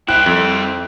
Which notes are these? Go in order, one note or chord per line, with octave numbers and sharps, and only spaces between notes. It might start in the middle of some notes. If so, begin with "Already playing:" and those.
E4 C5 E5 G5 F#6
F2